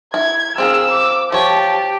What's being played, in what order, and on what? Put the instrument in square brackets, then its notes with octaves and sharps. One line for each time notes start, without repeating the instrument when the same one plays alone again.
[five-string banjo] E4 [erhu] G#6
[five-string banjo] C4 F4 A#4 [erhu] G#4 [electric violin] E6
[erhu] D6
[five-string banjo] F3 C#5 [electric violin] G4 [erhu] A5